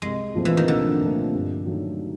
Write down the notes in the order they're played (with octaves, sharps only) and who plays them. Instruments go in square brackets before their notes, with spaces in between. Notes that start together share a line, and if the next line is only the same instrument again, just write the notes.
[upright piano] C2 [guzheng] G#3
[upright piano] A#2 F3 A3 C4
[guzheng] E3
D#3
[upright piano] C2 [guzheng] D3
[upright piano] A#2 F3 A3 C4
G2
D#3 F#3 A3